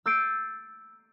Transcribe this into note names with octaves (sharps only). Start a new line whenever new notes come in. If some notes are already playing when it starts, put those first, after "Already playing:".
E6 G6 A6 C7 D7 D#7